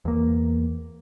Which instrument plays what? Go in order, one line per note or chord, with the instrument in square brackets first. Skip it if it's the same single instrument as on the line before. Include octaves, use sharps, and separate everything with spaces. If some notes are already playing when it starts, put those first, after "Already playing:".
[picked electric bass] E2 A#3